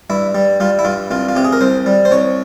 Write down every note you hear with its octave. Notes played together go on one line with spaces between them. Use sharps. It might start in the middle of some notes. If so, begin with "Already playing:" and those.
G2 E4
G3
G3 F4
E4
G2 F4
C2 F4
F4
C3 G4
G#4
A#4
C2 C5
G3
C5
C2 C#5